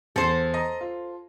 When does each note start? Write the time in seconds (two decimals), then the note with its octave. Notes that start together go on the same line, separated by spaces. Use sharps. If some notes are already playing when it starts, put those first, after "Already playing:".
0.16 E2 A4 C5
0.54 D#5 A#5
0.81 F4